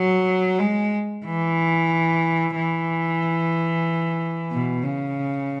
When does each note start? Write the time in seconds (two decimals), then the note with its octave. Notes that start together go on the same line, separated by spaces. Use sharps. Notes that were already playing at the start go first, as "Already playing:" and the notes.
Already playing: F#3
0.59 G#3
1.25 E3
2.56 E3
4.51 B2
4.84 C#3